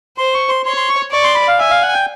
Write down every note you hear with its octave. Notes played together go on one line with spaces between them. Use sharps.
C5 C6
C#6
C6
C#5 C6
C6
C#6
D5 C#6
C6
B5
F5
E5 G#5
F5
F#5
G5